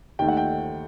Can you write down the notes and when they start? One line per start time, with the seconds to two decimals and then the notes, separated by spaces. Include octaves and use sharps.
0.19 D#2 D#3 A3 G5
0.28 F#5
0.37 G5